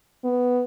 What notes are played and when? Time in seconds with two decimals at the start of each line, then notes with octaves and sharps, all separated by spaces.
0.24 B3